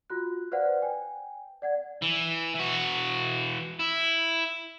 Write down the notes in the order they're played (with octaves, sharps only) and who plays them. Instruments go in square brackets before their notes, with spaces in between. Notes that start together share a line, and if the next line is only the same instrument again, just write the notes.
[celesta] F4 F#4 F#6
B4 C5 D5 F5 F#5
G5 G#5
D5 F#5 G#6
[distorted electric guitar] E3
E3 F#4
E4